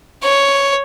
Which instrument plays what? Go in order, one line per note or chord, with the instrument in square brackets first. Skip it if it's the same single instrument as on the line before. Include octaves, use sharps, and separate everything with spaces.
[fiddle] C#5